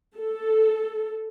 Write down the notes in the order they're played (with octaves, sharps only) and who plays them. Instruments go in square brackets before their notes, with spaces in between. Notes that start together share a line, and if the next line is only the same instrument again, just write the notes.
[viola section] A4